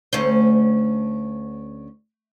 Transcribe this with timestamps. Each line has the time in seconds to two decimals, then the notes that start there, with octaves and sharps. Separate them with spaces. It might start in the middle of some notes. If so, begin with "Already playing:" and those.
0.13 D2 C#4 C5